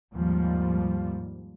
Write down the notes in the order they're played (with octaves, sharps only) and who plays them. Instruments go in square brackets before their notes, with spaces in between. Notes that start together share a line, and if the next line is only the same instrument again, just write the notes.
[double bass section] D#2 G#2 F3 G3